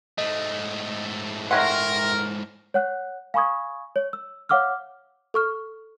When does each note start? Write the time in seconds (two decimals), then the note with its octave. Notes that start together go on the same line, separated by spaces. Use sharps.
0.18 G#2 A3 D#5
1.51 G#3 A#4 C#5 E5 F#5 G5 C6
2.74 C#5 F#5 F#6
3.34 F5 G#5 B5 C#6 D#6 G#6
3.96 C#5
4.13 E6
4.49 C#5 F5 F#5 D6 E6 F6
5.34 A4 C#6 F6